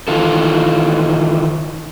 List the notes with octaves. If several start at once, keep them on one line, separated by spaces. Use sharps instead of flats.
D#3 E3 F4 A4